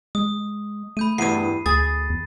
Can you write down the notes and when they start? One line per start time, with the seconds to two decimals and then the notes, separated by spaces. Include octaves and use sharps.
0.15 G#3 D#6
0.97 A3 B5 G6 D#7
1.18 E2 G2 C7 D#7
1.66 D2 G#4 A6
2.10 E2